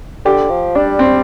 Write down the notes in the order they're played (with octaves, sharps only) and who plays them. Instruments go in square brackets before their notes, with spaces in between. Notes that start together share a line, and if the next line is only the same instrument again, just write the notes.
[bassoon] D3 [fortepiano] G4
[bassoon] F3
[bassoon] G3 [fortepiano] D4
[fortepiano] C4